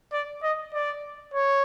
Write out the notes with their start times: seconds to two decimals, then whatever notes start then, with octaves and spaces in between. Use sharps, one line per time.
0.13 D5
0.43 D#5
0.74 D5
1.34 C#5